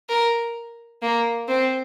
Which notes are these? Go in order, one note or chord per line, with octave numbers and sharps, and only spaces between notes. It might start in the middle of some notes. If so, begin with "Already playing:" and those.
A#4
A#3
C4